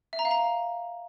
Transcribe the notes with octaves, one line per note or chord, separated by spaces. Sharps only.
E5
A#5
F5
A#5